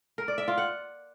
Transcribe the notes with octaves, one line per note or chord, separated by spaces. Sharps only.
A#4
D5
E5
F4
F#5